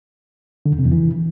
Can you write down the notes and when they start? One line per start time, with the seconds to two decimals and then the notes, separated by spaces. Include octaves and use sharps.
0.66 D3
0.72 E2
0.79 C3
0.85 E2
0.92 E3